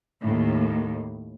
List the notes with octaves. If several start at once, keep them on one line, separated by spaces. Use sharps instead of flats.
D#2 A2